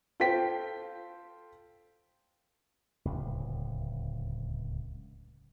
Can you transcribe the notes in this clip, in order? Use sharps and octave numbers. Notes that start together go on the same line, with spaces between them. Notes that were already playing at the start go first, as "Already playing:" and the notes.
F4 A4 C5 G5 B6
D1 C#2